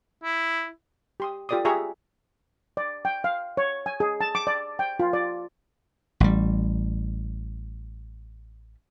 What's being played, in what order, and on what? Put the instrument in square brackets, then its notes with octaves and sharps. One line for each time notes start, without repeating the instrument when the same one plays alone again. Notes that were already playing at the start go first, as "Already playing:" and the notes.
[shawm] E4
[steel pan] G4 C6 D#6
F4 G4 A4 D5 D6 D#6
F4 G4 G#4 E5 A#5 C#6
D5
G5
F5
C#5
G#5
G#4
A5
D6
D5
G5
F4
D5
[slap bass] A1 G3